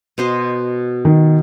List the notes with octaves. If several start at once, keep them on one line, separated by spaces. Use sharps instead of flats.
B2 C5 D#5
D#3